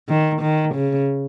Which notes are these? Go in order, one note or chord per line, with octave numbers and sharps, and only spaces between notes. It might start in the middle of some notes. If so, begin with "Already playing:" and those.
D#3
D#3
C#3